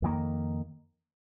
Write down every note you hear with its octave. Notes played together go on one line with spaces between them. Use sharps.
F2 D#3 A#3